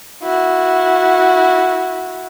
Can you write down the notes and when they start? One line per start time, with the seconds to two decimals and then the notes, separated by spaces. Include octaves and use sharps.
0.23 E4 F#4